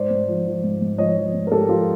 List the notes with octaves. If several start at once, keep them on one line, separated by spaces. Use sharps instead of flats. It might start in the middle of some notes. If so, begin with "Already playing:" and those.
Already playing: G#2 C5 D5
G#2
F3
F3
G#2
G#2
F3 C#5 D#5
F3
G#2
A#4
G#2 G4 A4
F3 F4 G4